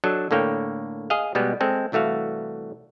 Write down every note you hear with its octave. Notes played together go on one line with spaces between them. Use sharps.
F#3 D4 A4 D#5
A2 D3 A#3 C#5 G5
G#4 D#5 F5
B2 G3 G#3 B3
G#3 C4 A4
C2 E3 A3 F#4 F5